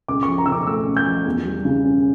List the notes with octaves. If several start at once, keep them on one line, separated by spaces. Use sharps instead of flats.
C#2 D6
C#6
F3
A#5
C#3 E6
D6
A3 E6
C#2
G6
F3
E2
G3
C#3
C#4